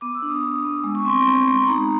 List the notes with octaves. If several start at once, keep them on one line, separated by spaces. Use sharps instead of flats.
B3 D6
E6
D4
D#6
D4
B3
G#3
C#6
C4 C6
C6
C4 B5
G#3
D#4 A#5